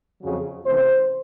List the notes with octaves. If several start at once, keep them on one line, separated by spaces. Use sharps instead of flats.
F2 C#3 F#3
C3 E3 A3 C#4 C5